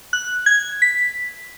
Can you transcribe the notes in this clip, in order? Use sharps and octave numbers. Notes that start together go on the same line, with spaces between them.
F#6
G#6
B6